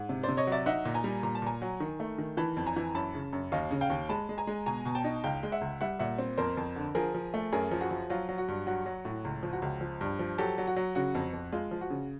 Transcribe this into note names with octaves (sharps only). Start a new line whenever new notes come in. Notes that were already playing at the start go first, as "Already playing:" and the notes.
Already playing: G#2
C3
C5 D5
C3
C#5 D#5
F#3 D5 E5
D#4 E5 F#5
A#2
G#5 A#5
G3
A#2 A#5
A5
A#2 G#5 A#5
F#3
D#3
A3
D#3
E3 A5 B5
F2
G#5 A#5
E3
F#2 A5 B5
C#3
F#2
D#2 D#5 F5
C#3
F5 G5
D#2
G#3 A5 B5
G#3
G#5 A#5
G#3
B2 G#5 A#5
B2
G5 A5
D#4
C#2 F5 G5
G#3
E5 F#5
C#2
G3 E5 F#5
A#2 E5 F#5
C4
F2 A#4 C5
F2
D3
F3 G#4 A#4
F3
A3
F#2 G#4 A#4
F3
F#4 G#4
F3
F#3 F4
F#3
F#4
G2
F#3 F#4
F#3
A2
C#2
F3
F#4
C#2
F3
G2
F3
F#3 G4 A4
F#3
F#4
F#3
C#3 F#4
F2
F2
G#3 F4
F3
F#4
C#3